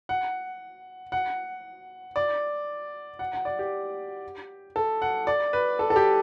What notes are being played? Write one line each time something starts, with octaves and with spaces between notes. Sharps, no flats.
F#5
F#5
D5
F#5
F#5
D5
G4
A4
F#5
D5
B4
A4
A4
G4